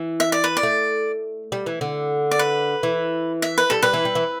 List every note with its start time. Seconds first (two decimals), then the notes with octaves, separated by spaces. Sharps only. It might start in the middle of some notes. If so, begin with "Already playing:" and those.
Already playing: E3
0.20 E5
0.32 D5
0.44 B4
0.57 D5
0.63 A3
1.52 G3
1.66 E3
1.81 D3
2.31 D5
2.39 B4
2.83 E3
3.42 E5
3.58 B4
3.70 G3 A4
3.83 G3 B4
3.94 E3
4.05 G3
4.15 E3